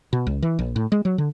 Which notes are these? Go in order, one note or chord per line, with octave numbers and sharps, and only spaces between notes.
B2
C#2
E3
A#1
A2
G#3
F#3
D3